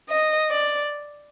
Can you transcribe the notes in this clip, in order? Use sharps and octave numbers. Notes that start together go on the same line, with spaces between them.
D#5
D5